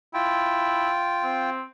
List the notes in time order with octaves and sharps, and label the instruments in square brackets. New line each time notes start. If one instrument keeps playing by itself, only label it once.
[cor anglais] E4 [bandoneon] F4 G5
[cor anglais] C4